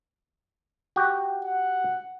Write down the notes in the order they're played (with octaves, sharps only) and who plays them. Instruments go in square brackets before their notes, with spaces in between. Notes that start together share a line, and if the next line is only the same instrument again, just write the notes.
[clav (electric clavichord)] F#4 G4 G5
[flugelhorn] F#5